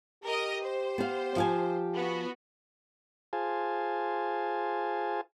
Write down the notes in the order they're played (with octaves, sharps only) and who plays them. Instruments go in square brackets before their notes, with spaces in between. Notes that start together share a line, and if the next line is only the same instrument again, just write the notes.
[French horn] G4 [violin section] A#4 D#5
[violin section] C5
[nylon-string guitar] B3 F5
F3 F5 G#5
[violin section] B3 F#4
[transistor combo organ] F4 G#4 C5 F5 G#5 A5